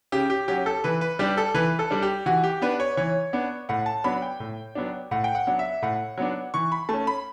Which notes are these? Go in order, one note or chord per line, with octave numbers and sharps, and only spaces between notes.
C#3 G4
G4
F#3 C#4 G4
A4
E3 B4
B4
G3 D4 G4
A4
E3 B4
A4
G3 D4
G4
E3 F#4
G4
B3 D4 B4
C#5
E3 C#5
B3 D4
A2 F#5
A5
F#3 B3 D4 B5
G5
A2
F#3 B3 D4
A2 F#5
G5
F#5
F#3 B3 D4
E5
A2 F#5
F#3 B3 D4
E3 C#6
B5
A3 C#4 A5
B5